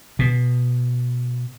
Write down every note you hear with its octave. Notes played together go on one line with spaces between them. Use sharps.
B2